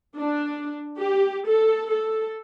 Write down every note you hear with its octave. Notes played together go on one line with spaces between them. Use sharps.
D4
G4
A4
A4